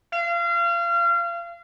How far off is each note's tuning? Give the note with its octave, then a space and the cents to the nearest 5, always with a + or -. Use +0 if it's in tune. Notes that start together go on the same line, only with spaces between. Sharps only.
F5 -30